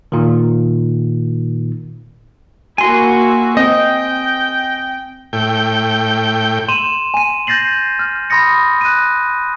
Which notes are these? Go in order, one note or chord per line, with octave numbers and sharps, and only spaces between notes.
A#2 D#3
A#3 E4 F#4 G#5 C6
C4 C5 D#5 G5
A2 G5
C6 D#7 E7 F#7
G#5 D#7
G6 A6 A#6 C7 F#7
F6
B5 C6 D#6 A6 A#6 C#7
F#6 D#7